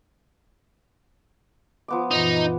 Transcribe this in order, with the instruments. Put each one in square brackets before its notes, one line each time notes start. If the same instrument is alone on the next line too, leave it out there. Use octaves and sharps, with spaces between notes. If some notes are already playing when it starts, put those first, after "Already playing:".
[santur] F3 B3 D6
[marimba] F#2 A#2 E3 [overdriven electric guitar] D#4